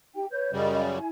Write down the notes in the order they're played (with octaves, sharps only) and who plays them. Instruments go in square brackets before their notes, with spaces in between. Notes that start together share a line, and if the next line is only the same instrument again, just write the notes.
[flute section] D#4 G4 G5
B4 C#5 G6
[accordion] F#2 C#3 G3 [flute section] D#5
[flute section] E4 G#5